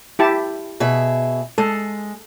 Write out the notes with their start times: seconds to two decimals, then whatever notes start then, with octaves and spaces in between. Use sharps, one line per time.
0.19 E4 G4 A5
0.80 B2 G#4 E5
1.58 G#3 A4